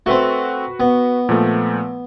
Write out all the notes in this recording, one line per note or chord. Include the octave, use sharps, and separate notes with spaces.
A3 C4 F#4 B4
B3
A#2 F3 A3